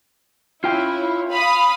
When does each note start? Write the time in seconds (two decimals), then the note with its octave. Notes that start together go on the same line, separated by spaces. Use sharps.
0.64 C#4 E4 F4 G5
1.31 F5 B5 D#6